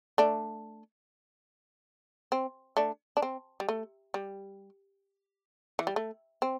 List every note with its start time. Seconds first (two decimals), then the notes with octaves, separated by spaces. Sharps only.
0.18 A3 D4
2.32 C4
2.77 A3 D4
3.17 D4
3.22 C4
3.60 G3
3.69 A3
4.14 G3
5.79 E3
5.87 G3
5.96 A3
6.42 C4